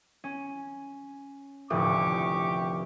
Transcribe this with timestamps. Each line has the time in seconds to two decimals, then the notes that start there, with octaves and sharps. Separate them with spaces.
0.24 C#4
1.70 F1 D2 A2 G4 C#6 D6